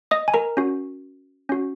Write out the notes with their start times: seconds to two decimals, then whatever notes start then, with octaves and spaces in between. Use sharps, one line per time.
0.11 D#5 D#6
0.28 G#5
0.34 A#4 A#5
0.57 C#4 F#4
1.49 C#4 F#4